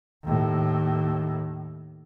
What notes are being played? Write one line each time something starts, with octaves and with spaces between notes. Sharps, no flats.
D#2 A2